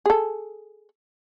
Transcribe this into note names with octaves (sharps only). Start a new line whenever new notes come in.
G#4 A4